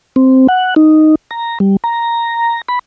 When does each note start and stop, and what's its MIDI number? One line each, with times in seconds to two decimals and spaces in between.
0.16 0.47 60
0.48 0.74 78
0.76 1.15 63
1.31 1.58 82
1.60 1.77 55
1.84 2.61 82
2.68 2.79 83